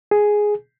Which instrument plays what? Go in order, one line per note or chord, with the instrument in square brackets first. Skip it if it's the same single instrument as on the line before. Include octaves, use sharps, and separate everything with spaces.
[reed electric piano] G#4